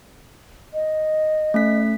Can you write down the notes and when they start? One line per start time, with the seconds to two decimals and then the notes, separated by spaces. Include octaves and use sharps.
0.74 D#5
1.54 A3 C#4 B6